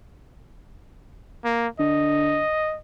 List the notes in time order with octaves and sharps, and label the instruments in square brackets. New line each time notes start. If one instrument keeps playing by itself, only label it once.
[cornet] A#3
[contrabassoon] D3 [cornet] D#5